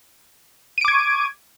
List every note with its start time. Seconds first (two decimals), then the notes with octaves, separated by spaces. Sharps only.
0.78 D#7
0.81 D7
0.85 D6
0.88 G#6
0.92 C#6